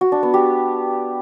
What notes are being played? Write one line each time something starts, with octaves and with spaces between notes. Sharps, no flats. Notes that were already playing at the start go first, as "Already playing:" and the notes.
F#4
D4
B3
G4